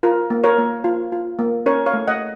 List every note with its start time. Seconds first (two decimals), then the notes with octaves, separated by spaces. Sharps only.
0.03 F4 A#4
0.30 A#3
0.44 A#4 C#5
0.58 A#3
0.84 F4
1.12 F4
1.39 A#3
1.66 C#4 A#4 C#5
1.86 C#5 F5
1.93 A3
2.08 D#5 F#5